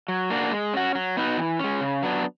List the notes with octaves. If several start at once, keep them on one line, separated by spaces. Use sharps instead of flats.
F#3
A#3 D4 F#4
G#3
C#4 F#4
F#3
B3 D#4 F#4
E3
G#3 C#4
C#3
F#3 B3 D4